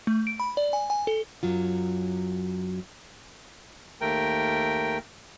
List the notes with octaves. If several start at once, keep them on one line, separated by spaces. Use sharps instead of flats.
A3
D7
B5
D5
G#5
G#5
A4
F#2 F#3 F4
D#2 A3 A#4 G5